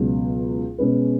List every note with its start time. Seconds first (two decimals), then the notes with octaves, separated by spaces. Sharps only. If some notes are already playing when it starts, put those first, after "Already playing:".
Already playing: C#2 B2 F#3
0.78 B2 G#3 C#4 G#4 B4